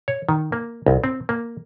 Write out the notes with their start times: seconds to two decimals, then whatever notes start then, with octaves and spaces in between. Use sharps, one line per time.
0.08 C#5
0.29 D#3
0.52 A#3
0.86 C2
1.04 C4
1.29 A#3